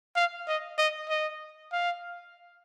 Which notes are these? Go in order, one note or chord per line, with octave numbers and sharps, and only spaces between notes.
F5
D#5
D#5
D#5
F5